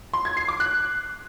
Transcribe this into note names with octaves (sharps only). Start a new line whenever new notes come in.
C6
G#6
C7
D6
F#6